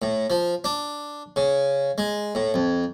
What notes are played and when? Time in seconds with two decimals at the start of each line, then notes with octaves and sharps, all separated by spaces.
0.02 A2
0.30 F3
0.64 D4
1.36 C#3
1.98 G#3
2.35 A2
2.54 F2